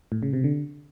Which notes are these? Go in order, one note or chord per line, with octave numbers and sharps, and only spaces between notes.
A2
C#3
C3
D3